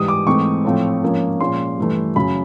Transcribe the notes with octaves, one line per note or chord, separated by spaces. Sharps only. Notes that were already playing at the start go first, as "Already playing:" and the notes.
Already playing: G#2 E3 G3 D#6
D6
G#2 E3 A3 C4 C#6
A2 F3 A3 C4
G#2 F3 A#3 C#4
A#2 F3 G#3 C#4 C6
G2 E3 A3
F#2 C#3 F#3 B5